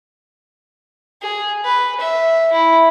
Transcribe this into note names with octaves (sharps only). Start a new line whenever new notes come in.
G#4
B4
E5
E4